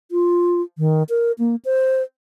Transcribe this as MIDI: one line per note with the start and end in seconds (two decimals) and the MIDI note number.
0.11 0.62 65
0.78 1.03 51
1.09 1.32 70
1.39 1.56 58
1.65 2.02 72